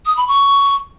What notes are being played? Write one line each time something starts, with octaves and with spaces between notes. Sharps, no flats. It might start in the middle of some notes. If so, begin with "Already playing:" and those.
D#6
B5
C#6